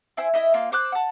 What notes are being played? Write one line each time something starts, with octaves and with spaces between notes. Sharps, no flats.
E4 C5 G#5 E6
E4 D#5 E5
A#3 F4
C5 D6 E6 F#6
F#5 A5